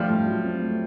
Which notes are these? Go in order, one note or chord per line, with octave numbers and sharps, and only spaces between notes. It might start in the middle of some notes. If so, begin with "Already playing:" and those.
Already playing: F3 G3 A3
A2
F#3
C4
A3